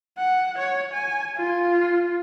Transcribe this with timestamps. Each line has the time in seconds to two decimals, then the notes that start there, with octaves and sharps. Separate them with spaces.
0.17 F#5
0.58 C#5
0.93 G#5
1.37 F4